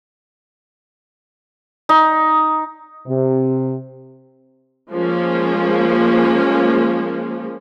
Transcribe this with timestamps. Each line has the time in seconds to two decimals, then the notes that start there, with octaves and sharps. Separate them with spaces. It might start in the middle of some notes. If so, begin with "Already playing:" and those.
1.89 D#4
3.07 C3
4.91 F3 G#3 A#3 C#4